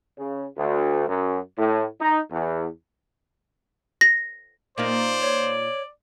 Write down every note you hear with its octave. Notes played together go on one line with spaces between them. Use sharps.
C#3
D2
F#2
A2
D#4
E2
A#6
A#2 A#3 D#4 C5 D5
C#5